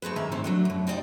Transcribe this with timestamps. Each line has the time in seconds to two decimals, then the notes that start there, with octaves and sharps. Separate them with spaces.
0.02 A3 C4 G#4 B4
0.16 G#2 C3 D#3 E5 G#5 A#5
0.32 D2 A2 C3 D#3 C4 C5
0.44 F#3 A3 D4
0.65 F#2 B2
0.87 C4 D#4 E4 D5 D#5 G5